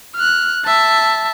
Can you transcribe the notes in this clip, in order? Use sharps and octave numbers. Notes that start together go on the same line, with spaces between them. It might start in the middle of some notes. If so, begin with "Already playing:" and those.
F6 F#6
E5 A5